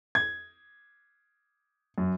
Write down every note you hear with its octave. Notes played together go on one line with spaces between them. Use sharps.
G#6
F#2